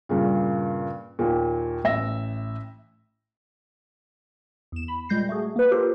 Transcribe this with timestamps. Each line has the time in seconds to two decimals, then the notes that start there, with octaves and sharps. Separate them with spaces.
0.09 G2 A#2 C#3
1.19 D#2 A#2
1.84 A1 E5 A#6
4.72 E2 E7
4.88 B5
5.09 A#2 G3 G#3 G6 A#6 C7
5.29 A3 F#4 G#4
5.56 A#3 B4
5.71 F4 G4 A4 A#4 C5